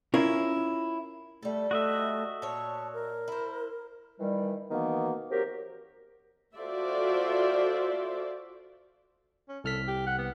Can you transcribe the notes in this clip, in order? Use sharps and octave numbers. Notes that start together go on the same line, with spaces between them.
C#4 E4 F4 A#4
G3 A3 A4
A3 F#4 D#5 E5
A#2 C#5 A5
A#4
E4 C5
D#3 E3 G3
B2 D#3 E3 A#3 B3
F#3 C4 G4 A#4
F4 F#4 A4 C5 D5 E5
C#4
C2 A4 F6 B6
G4
F#5
B3